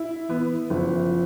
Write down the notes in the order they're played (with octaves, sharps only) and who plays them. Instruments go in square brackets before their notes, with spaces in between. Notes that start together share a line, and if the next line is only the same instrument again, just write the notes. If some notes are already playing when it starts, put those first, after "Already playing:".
Already playing: [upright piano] E4
[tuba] E3 [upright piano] B3
[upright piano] F#1 [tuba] F3